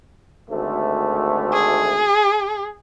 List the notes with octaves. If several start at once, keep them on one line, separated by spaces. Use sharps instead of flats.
G#1 D2 A3
G#4